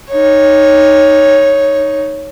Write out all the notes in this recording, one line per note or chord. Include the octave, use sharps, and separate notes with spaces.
D#4 C#5